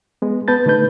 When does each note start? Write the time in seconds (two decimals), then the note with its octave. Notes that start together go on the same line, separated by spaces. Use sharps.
0.22 G#3 B3
0.48 B3 B4 A5 G6 A6
0.66 D3 A3 D#4 B4 G6